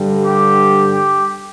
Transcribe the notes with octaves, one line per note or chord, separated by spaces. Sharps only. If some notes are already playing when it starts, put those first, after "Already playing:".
Already playing: G2 D3 G3
G4
G4